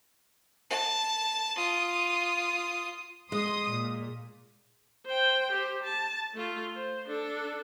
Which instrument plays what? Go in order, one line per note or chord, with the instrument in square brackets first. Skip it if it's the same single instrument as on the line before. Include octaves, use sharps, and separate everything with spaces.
[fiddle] A5
F4 D#6
[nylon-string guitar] G#3 [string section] C6 D#6
[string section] A#2
[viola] C5 G5
G4 C5
A5
A3 F4
C5
D4 A4